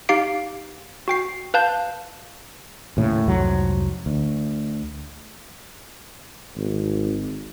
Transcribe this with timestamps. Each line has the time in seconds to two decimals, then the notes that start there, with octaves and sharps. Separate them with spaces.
0.09 D#4 G4 F5 C7 D7
1.08 F#4 G5 C7
1.54 B4 F5 A5 G6
2.97 D#2 A2 C#3
3.27 C2 F2 G#2 F#3
4.06 D2
6.57 G#1